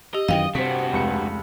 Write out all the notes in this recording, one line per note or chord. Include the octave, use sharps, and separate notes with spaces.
G4 D#5
F#2 D#3 E3 F5 G5
G2 C3 C4 F#4 B6
F1 C#2 C#7